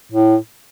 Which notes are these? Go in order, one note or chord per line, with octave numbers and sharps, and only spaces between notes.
A2